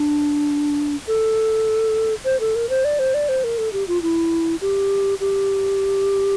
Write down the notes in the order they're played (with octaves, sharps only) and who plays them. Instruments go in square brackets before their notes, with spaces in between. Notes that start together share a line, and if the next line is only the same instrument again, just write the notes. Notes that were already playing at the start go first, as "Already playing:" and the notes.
Already playing: [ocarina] D4
A4
C5
A4
A#4
C5
D5
C5
D5
C5
A#4
A4
G4
F4
E4
G4
G4